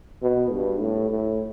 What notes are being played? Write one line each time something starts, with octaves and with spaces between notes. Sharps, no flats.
B2
G2
A2
A2